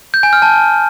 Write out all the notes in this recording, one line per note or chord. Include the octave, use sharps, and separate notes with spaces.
G6
G#5
F6
A5